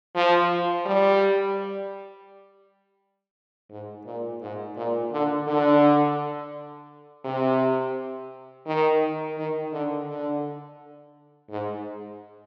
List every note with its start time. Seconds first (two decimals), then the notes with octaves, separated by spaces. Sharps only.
0.15 F3
0.86 G3
3.70 G#2
4.06 A#2
4.41 G#2
4.77 A#2
5.12 D3
5.48 D3
7.25 C3
8.66 D#3
9.38 D#3
9.72 D3
10.08 D3
11.50 G#2